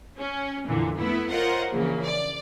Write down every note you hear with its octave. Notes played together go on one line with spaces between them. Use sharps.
C#4
F2 A#2 D3 E3
A3 B3 E4
F4 A#4 C5 C#5 D#5 F#5
A#1 C#3 E3 A#3
D5